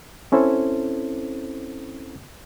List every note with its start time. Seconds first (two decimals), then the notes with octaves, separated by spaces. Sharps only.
0.32 C4 C#4 E4 A4 C5